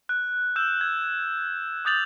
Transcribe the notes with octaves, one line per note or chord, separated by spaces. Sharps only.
F#6
E6 G6 E7
G#6
D6 D#6 G6 A6 F7 F#7